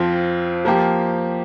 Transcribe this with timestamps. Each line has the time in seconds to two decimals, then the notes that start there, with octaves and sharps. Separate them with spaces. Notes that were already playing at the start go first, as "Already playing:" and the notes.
Already playing: F2 F3 C4 F4
0.65 F3 A#3 G4